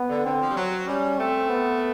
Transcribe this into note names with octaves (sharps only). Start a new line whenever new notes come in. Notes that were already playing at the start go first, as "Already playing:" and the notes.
Already playing: B3
D3
D3 C4
F3
G3
F#3
G3 C#4
A3 C4
B3